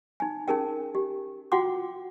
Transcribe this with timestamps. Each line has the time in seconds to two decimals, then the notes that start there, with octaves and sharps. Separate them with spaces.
0.20 D#4 G#5
0.48 C#4 D#4 G#4 A#4 G5
0.95 G4
1.52 F4 F#4 F#5 G5 C6 D6